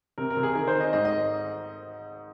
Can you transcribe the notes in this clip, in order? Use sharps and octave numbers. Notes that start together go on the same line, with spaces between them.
C3 A#4
A#4
C3
G#4
D#3 A#4
C5
D#3
D#5
G#2 D#5
D#5